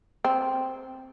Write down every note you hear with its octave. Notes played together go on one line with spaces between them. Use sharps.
C4